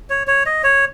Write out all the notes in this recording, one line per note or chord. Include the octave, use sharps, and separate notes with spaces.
C#5
C#5
D#5
C#5